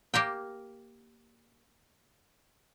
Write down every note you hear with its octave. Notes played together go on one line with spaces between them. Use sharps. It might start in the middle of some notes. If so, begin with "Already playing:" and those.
A#3 G4 A#4 G5